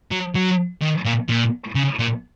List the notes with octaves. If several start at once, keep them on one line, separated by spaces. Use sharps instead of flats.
F#3
F#3
D#3
A#2
A#2
C#3
A#2